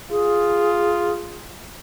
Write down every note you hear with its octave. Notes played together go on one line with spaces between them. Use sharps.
F4 G#4